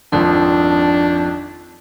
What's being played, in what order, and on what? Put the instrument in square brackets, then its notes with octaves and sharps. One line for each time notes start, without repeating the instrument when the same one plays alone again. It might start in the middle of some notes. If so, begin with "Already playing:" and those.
[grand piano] G#1 F2 F3 [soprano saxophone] D4